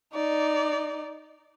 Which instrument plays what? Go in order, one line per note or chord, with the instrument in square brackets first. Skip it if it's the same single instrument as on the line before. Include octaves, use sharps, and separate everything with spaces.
[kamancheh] D#4 D5